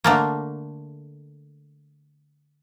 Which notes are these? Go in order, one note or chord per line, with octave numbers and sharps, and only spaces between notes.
D3 A3 A#3